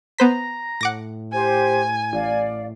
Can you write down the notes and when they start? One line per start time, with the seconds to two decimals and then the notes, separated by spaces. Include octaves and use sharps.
0.18 B3 C5 A#5 B6
0.81 A2 F#5 D6 A#6
1.32 G4 C5 G#5
2.13 A1 D5 F5